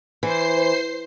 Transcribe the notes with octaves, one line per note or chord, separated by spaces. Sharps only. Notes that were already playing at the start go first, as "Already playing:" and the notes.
E3 C5 C7